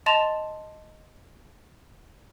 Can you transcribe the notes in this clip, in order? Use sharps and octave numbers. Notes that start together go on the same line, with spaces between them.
D#5 A5 C6 A6 E7 F7